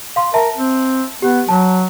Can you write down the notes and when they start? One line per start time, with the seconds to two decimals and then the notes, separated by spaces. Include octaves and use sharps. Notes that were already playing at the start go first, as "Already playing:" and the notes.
0.16 F5 C6
0.34 A#4 E5 A5
0.57 C4
1.22 B3 G4
1.49 F#3 A5